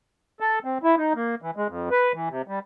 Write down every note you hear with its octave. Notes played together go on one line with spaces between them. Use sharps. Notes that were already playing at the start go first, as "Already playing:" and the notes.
A4
C4
E4
D#4
A#3
E3
G#3
F2
B4
E3
C3
G3